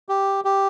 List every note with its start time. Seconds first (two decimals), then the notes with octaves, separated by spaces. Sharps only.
0.09 G4
0.45 G4